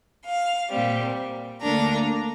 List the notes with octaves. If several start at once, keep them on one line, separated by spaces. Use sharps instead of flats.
F5
A#2 G3 C4
D2 D3 A#3 D4 A#5